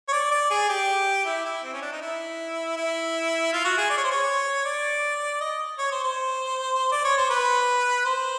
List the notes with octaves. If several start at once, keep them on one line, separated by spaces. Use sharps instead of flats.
C#5
D5
D5
G#4
G4
E4
E4
C4
C#4
D4
D#4
E4
E4
F4
F#4
G#4
D5
C#5
C5
C#5
D5
D#5
C#5
C5
C5
D5
C#5
C5
B4
C5